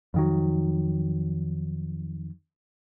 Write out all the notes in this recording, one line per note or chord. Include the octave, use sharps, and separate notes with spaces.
F2 D#3 F#3